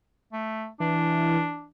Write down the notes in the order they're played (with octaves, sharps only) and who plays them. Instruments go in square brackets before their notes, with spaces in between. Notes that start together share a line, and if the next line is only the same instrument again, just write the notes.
[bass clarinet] A3
[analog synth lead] E3 [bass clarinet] D4